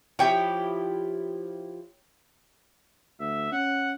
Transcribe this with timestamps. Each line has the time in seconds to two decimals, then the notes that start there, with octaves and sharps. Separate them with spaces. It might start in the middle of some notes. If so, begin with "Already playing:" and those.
0.19 F3 E4 G4 C#5 G5
3.20 D2 E5
3.52 C#4 F#5